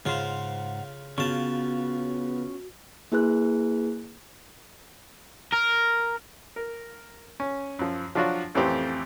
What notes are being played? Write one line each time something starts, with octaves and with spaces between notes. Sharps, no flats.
G#2 C#3 F4 C5 F#5
C#3 B3 C#4 F4 F#4 A5
A#3 E4 G#4 B4 F#6
A#4
A#4
C#4
F#2 F3
F3 F#3 D4 F4 F#4
A1 F2 E3 A3 C4 G4